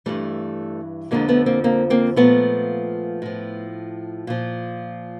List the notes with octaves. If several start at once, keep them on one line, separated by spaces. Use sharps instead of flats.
G2 E3 G3 A3
F2 D3 F3 G#3 A#3
A3 B3
A#3 C4
A#3 C4
A#3 C4
A#2 F3 A3 B3
A2 F3
A#2 F3